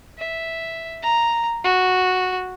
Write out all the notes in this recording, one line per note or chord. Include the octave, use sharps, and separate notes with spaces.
E5
A#5
F#4